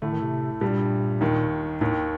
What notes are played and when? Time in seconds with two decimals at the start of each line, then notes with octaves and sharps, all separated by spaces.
0.02 A2 D3 A3
0.12 D#3
0.22 C3
0.61 G2 A#2 G3
1.21 D#2 D#3
1.81 D#2 A2 D#3